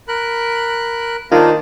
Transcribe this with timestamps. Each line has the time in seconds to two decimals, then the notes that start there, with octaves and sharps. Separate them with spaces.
0.08 A#4 B5 F#6
1.32 D#3 A#3 D4 F4 C5 A5